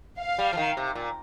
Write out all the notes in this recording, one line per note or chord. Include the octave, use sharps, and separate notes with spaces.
F5
G3
F3
D#3
C3
A#2